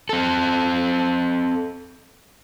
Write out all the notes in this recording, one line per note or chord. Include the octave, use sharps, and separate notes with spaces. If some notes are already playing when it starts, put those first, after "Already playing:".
C4 A4